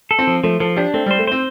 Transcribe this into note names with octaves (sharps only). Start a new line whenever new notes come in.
A4
C4
F3
F3 A3
F3 A4
D4 G4
A3 C4
G3
C5
A3
C4 C5